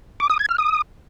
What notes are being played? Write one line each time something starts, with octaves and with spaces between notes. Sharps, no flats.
D6
D#6
G#6
F6
D#6